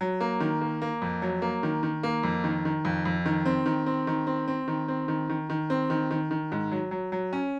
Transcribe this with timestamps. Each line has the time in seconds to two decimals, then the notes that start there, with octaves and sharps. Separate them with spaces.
0.01 F#3
0.21 A#3
0.40 D#3
0.61 A#3
0.82 A#3
1.02 F2
1.22 F#3
1.42 A#3
1.63 D#3
1.83 D#3
2.03 A#3
2.23 F2
2.44 D#3
2.65 D#3
2.85 F2
3.05 F2
3.26 D#3
3.46 C4
3.66 D#3
3.86 C4
4.07 D#3
4.27 C4
4.48 C4
4.68 D#3
4.88 C4
5.08 D#3
5.30 D#3
5.50 D#3
5.70 C4
5.90 D#3
6.11 D#3
6.31 D#3
6.52 G#2
6.71 F#3
6.91 F#3
7.12 F#3
7.33 C#4